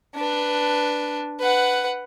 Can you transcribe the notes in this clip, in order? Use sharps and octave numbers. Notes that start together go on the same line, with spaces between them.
D4 B4
B4 F#5